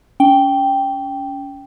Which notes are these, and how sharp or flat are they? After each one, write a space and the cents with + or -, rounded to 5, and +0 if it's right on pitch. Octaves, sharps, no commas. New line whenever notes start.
C#4 +25 G5 +0